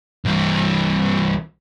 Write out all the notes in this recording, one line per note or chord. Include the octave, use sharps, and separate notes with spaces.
C2 E3